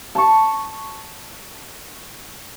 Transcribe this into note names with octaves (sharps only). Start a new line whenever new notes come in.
A5 C#6